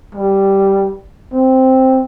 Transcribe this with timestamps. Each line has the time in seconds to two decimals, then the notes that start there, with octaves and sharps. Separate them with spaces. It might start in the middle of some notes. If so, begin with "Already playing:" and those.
0.15 G3
1.33 C4